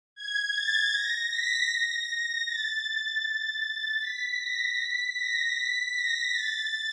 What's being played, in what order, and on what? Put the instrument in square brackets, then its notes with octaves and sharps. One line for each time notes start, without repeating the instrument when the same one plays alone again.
[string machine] G#6
A6
A#6
B6
A#6
A#6
A6
A6
B6
A#6
B6
A#6
B6
A#6
A6